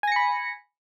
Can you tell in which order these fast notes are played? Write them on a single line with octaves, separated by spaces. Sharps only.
G#5 A#6 C#7 B5